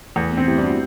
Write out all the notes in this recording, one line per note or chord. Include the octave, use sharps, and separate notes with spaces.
E2 A3
B3
C4
E4 G4
G3
D4 F#4